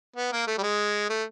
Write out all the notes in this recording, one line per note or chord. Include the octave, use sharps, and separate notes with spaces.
B3
A#3
A3
G3
G#3
A3